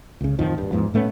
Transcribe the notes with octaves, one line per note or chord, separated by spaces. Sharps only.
C#2 C#3
A1 F2 D#3 F3
D1 G2
E2 G#2 F3 B3
A2 A3 B3 C#4